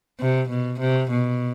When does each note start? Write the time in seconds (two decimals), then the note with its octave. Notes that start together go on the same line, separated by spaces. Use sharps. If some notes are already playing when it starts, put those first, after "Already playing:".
0.20 C3
0.49 B2
0.80 C3
1.11 B2